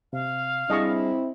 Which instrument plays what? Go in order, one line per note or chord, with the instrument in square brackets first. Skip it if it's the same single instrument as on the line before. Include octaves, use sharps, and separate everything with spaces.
[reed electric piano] C3 [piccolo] F5
[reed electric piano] G3 D4 G#4 [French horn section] C4 E4 [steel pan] D#5 A5 C#6